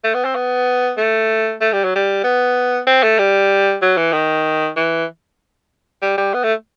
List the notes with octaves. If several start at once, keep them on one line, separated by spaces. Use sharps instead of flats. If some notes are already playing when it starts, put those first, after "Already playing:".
A3
B3
C4
B3
A3
A3
G3
F#3
G3
B3
C4
A3
G3
F#3
E3
D#3
E3
G3
G3
B3
A3